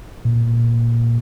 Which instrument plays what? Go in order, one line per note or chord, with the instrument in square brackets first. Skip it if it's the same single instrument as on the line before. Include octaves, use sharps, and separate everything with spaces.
[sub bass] A#2